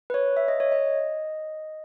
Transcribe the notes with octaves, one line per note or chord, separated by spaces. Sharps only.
B4
C#5
E5
D#5
C#5
D#5